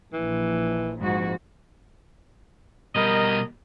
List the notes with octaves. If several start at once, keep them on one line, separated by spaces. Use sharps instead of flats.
A#1 E3
F2 G#2 F#4
B2 G3 A#4 D#5